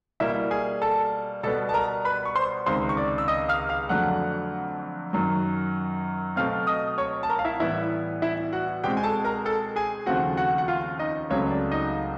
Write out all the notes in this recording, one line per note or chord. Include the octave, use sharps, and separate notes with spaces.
B2 G3 A#3 E4 E5
G#4 G#5
A4 A5
B2 G3 B3 A4 A5
A5
A#4 A#5
B4 B5
C#6
C5 C6
C#2 C3 D#3 C5 C6
C#6
D5 D6
E6
D#5 D#6
F5 F6
F5 F6
F2 D3 F#3 A3 F#5 F#6
F#2 D#3 F#3
B2 F#3 A3 C4 F5 F6
D#5 D#6
C#5 C#6
A5
A#4 A#5
F5
E4 E5
A2 E3 G3 B3 E4 E5
E4 E5
F#4 F#5
B2 G#3 C4 G4 G5
G#5
A4 A5
A#4 A#5
A4 A5
G#4 G#5
D#2 C#3 F3 A3 C4 F#4 F#5
F#4 F#5
F#5
F4 F5
D#4 D#5
C#2 C#3 F#3 A3 C4 C#5
D5
D#4 D#5